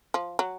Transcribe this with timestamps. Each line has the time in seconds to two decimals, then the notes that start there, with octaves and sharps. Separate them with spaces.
0.14 F3
0.39 F#3